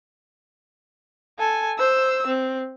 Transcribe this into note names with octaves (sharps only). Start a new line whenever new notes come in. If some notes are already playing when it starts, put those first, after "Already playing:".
A4 G#5
C5 E6
C4